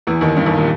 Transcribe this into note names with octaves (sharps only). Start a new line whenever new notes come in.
E2 E3
D#2 D#3
G2 G3
D#2 D#3
A#2